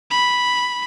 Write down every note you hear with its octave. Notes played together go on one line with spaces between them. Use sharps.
B5